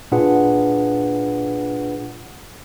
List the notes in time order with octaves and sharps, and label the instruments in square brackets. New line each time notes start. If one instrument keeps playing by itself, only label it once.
[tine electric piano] A#2 D4 F4 G#4 B4 F#5